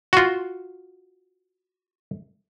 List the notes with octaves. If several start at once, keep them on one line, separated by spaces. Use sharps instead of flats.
F4 F#4